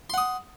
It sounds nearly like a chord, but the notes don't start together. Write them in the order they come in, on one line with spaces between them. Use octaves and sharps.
C6 F#5 D#6